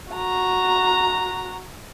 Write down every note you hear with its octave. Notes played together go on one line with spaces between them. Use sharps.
F#4 A#5